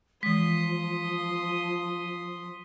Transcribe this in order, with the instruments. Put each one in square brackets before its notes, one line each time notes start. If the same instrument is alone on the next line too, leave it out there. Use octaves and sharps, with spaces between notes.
[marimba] E3 G#3 [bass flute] F3 [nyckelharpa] C6 D#6 [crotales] B6